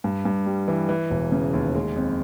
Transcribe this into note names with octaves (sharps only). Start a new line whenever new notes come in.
G2
G2
G3
E3
E3
E1
C#3
D#2
G#3
F2